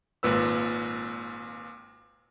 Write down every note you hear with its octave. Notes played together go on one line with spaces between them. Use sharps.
G#1 A#2 B4 E6